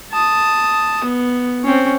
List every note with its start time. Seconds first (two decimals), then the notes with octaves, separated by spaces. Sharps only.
0.12 A5 D#6
1.04 B3
1.63 C4 C#4